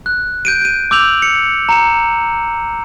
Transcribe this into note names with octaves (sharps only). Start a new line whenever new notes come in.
F#6
G6 D7 D#7
G6 D#7
D6 E6 G6 F7 F#7
C#7
A#5 C#7 E7